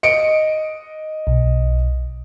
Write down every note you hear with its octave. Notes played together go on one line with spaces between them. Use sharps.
D#5 C#7 D7
B1